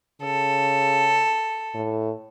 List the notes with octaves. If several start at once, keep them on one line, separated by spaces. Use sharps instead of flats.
C#3 A4
A2